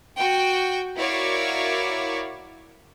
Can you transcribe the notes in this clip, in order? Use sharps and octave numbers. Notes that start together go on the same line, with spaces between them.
F#4 G5
E4 F#4 A#4 C#5 D5 F5